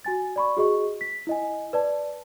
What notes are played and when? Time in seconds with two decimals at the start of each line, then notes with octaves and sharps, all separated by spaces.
0.05 F#4 G#5 A6
0.36 D5 B5 C#6
0.57 F#4 G#4 D#5 C#6
1.01 B6
1.27 E4 D#5 G#5
1.73 B4 D5 A5